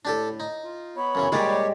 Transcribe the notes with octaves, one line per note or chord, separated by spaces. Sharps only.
A2 D4 G4 A4
D#4
F4
B3 C#5 B5
F#2 C#3 E3
A#2 G3 G#3 G4 G#4 C#5 D5